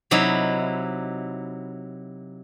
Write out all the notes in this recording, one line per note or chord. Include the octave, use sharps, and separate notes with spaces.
C3 F#3 D#4 E4